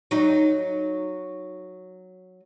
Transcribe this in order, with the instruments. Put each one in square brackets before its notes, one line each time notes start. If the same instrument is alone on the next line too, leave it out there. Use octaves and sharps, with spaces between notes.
[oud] F#3 D#4